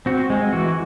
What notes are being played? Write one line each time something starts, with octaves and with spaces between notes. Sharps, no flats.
C4 F#4
G#3
E3 F#4